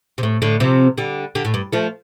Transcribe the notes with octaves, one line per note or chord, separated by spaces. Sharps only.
C3
A2
A2 D3
C3 F3
D3 G3
D3 G3
A2
G2
F3 A3